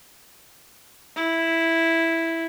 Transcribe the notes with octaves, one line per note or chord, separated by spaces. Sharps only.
E4